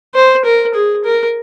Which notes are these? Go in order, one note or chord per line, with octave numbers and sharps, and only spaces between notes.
C5
A#4
G#4
A#4